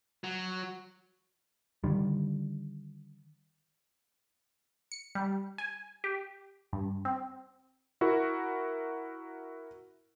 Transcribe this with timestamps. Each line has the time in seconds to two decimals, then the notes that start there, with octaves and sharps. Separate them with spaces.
0.24 F#3
1.84 D3 D#3 G3
4.92 C#7
5.15 G3
5.58 G#5
6.04 G4
6.73 G2
7.05 C4
8.01 E4 F#4 A#4